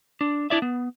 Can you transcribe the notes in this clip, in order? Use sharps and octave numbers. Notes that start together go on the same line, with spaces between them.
D4
D4 E4 D5 E5
B3